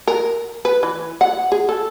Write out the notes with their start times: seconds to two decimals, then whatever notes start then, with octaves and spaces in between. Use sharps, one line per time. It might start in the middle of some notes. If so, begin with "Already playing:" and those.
0.07 A#4
0.65 B4
0.83 E3
1.21 F#5
1.52 G#4
1.69 A4